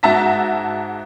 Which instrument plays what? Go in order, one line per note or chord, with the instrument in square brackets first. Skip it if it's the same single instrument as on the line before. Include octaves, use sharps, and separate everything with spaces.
[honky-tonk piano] G#2 F#4 E5 A5 A#5 B6